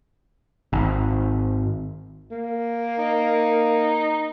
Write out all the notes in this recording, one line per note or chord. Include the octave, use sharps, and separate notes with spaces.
G#1
A#3
D#4